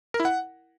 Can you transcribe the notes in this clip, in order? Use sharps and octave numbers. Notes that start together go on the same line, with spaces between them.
A#4
E4
F#5